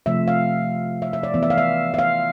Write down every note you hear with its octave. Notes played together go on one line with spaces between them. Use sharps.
C3 F3 A3 E5
F5
E5
E5
D5
E3 B3 D5
E5
F5
E5
E5
F5